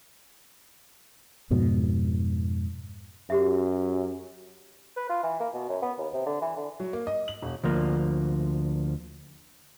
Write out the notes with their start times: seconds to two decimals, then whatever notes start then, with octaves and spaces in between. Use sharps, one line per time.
1.50 F2 G#2 B2
3.30 F#2 F#4 G4 E5
4.97 B4
5.09 F4
5.23 E3
5.40 A#3
5.54 B2
5.69 F#2
5.82 B3
5.99 D#2
6.14 C3
6.26 D3
6.41 E3
6.57 D3
6.80 F#3
6.93 A#3
7.07 D#5
7.28 F#7
7.42 E1
7.64 D2 F3 A#3